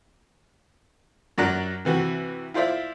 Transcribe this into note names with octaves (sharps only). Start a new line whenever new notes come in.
F#2 F#3 D5 F#5 A#5 F#6
C3 E3 F#4
E4 F4 C5 D5 E5